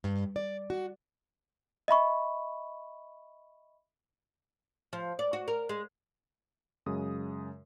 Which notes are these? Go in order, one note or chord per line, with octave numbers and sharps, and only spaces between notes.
G2
D5
F#4
D#5 E5 B5 C#6
F3
D5
F#4
A#4
G#3
F#2 C#3 G#3 D#6